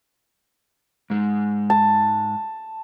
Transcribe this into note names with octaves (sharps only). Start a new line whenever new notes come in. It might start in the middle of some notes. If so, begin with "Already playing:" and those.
G#2 G#3
A5